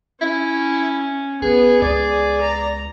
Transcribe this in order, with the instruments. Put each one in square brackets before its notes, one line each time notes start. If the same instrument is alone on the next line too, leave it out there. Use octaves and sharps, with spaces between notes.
[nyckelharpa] C#4 [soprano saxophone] E4
[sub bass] G1 [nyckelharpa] B3 [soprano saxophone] G#4
[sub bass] C#2 [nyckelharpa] G#4 [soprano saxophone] D5
[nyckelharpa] A#5